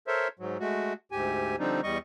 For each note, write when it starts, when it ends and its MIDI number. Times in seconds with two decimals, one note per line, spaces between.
0.07 0.28 69
0.07 0.28 70
0.07 0.28 72
0.07 0.28 73
0.07 0.28 76
0.39 0.58 44
0.39 0.58 54
0.60 0.93 56
0.60 0.93 57
0.60 0.93 66
1.12 1.56 38
1.12 1.56 44
1.12 1.56 67
1.12 1.56 80
1.59 1.81 50
1.59 1.81 53
1.59 1.81 55
1.59 1.81 60
1.59 1.81 62
1.59 1.81 63
1.83 1.98 40
1.83 1.98 55
1.83 1.98 75
1.83 1.98 85